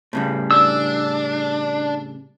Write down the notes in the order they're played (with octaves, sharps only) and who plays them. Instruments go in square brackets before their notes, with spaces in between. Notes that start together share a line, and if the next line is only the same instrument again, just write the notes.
[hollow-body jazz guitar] A2 C#3 G3
[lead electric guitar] D4 [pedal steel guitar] E6